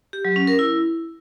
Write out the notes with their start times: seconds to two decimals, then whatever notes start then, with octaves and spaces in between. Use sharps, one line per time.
0.13 G4
0.25 F#3
0.36 C#4
0.47 A#4
0.59 E4